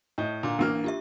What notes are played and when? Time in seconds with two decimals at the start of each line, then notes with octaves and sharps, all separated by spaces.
0.18 A2 D#5 G6
0.43 A#2 D3 A#5 D6
0.59 A1 A#3 B3 D4 F6
0.84 F4 G4 E5